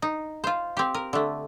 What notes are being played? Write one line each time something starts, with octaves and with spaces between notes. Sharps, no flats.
D#4
F4 C5
C4 G4
A#4
D3 A3